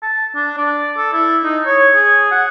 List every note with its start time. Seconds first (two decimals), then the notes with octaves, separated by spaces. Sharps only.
0.02 A5
0.35 D4
0.57 D5
0.97 A4
1.13 E4
1.44 D#4
1.66 C#5
1.95 G#4
2.31 F#5